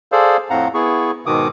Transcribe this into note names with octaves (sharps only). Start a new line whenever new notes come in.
G#4 A4 C5 D5 F5
F2 A2 C4 F5 F#5 A#5
B3 E4 G#4 C#6
G#2 B2 D#3 D6 D#6